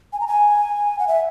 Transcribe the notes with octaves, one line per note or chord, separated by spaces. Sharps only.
G#5
A#5
G#5
F#5
E5